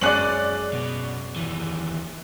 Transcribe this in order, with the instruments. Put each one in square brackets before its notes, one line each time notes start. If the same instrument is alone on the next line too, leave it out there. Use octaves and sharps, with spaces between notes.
[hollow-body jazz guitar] F#2 G#3 C#4 [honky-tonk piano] D5 F#6 F#7
[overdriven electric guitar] B2
D#2 E3